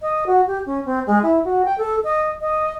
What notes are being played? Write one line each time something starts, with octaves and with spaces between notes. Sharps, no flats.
D#5
F#4
G4
C#4
C4
G#3
E4
F#4
G5
A4
D#5
D#5